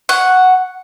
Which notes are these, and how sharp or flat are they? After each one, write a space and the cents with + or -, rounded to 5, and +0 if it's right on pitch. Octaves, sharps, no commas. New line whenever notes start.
F#5 +0 C#6 +0